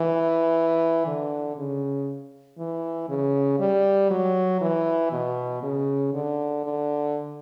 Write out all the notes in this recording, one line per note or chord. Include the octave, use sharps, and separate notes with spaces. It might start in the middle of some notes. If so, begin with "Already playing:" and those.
Already playing: E3
D3
C#3
E3
C#3
G3
F#3
E3
B2
C#3
D3
D3